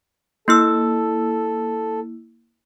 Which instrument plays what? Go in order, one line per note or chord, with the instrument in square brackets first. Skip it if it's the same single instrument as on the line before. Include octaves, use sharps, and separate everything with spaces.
[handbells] A#3 E4 E6 [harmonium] A4